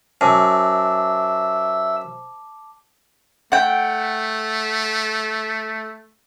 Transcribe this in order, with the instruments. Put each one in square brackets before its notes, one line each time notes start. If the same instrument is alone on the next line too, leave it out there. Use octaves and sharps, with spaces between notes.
[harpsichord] F#2 [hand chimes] C5 [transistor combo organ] E5 [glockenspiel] A5 D6
[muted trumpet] A3 [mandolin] F#5 G5